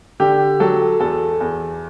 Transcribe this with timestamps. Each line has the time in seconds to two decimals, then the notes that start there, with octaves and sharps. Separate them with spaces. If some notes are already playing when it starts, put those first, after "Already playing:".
0.20 D3 G4
0.60 F#3 A4
1.00 E2 A4
1.40 E2